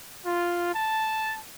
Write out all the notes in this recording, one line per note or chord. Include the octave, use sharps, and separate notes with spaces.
F4
A5